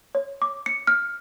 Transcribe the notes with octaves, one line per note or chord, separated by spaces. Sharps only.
C#5
D6
C#7
F6